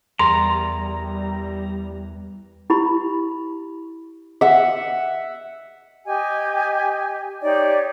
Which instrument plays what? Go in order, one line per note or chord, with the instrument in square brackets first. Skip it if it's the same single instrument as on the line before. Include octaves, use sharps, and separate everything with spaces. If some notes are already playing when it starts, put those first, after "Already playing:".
[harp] E2 A#4 A6 [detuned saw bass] G3 [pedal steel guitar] A#5 [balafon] C6
[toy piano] E4 G4 B5
[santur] E5 F#5
[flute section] G4 D#5 G#5
D#4 G4 C#5 D5